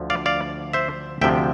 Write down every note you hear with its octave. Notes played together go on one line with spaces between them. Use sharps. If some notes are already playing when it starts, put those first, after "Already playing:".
Already playing: D2 D3 F3
D5 F5
D5 F5
C5 E5
D2 C3 F3 E5 G5